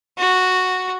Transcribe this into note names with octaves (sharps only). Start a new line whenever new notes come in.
F#4